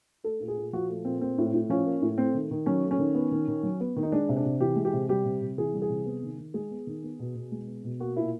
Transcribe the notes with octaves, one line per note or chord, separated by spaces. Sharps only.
A3 A4
A#2
G#4
A#2
F3 F#4
A3
A#2 C4
A#3 C4
A2
A2
F3 C#4
A#3
A2
A3 C4
D#3
D#3
F#3 C#4
A3
C#4
D#3
B3
D#3
D#3
F#3
B3
D#3
D#4
G#3 D4
C3
D4
C3
E3 G4
G#3
G4
C3
G3 G4
C3
C3
E3 G#4
G3
G#4
C3
B3
D#3
D#3
G#3 G#4
B3
D#3
B3
B2
B2
G#3
B3
B2
A#3 F#4
A#2 E4